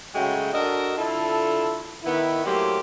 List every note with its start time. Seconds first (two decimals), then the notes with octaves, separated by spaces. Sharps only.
0.15 C#3 F#3 G#3 A3 F#4 G5
0.54 D4 F#4 A4 A#4 D#5
0.97 D3 E4 F4 A4
2.04 D#3 B3 E4
2.46 F#3 A3 A#3 E4 G4 C5